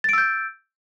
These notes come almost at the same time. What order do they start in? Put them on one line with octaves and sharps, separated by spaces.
A6 D7 E6 G6